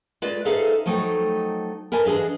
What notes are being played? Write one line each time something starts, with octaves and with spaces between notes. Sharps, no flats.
G#3 F4 B4 D5
D#4 G#4 A4 C5 E5 F5
F3 F#3 A3 D#4 D#5 G5
A#4 B4 D#5 G#5 A5
E3 D4 G#4 D#5 F5